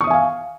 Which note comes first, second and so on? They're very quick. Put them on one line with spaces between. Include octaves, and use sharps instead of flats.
C#6 D#6 E5 G#5 F5